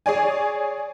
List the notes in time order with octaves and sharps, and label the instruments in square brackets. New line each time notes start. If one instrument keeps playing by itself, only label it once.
[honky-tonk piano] G#4 C#5 D5 G#5